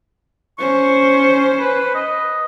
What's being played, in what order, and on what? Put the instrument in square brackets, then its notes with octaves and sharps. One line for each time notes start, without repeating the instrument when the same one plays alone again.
[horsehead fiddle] C#4 C5 [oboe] C#6
[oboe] B4
D#5